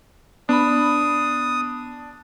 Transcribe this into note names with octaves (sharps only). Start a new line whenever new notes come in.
B3 D4 B5 D#6